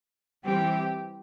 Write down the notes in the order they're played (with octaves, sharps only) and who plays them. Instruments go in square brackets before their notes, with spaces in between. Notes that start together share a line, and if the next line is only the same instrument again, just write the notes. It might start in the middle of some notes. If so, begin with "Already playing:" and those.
[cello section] E3 G3 C4 [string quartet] G4